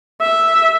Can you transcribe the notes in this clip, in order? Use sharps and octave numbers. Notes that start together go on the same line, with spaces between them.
E5